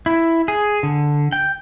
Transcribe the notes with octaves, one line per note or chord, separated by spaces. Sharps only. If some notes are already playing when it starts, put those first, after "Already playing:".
E4
G#4
D3
G5